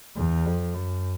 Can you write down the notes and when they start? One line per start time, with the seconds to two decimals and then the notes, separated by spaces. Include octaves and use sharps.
0.16 E2
0.45 F2
0.74 F#2